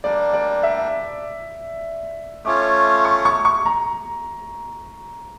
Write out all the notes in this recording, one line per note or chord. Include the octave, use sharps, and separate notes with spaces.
G3 A#3 D4 D5
D5
E5
A3 C#4 F4 C#5 D6
C#6
C#6
C#6
A#5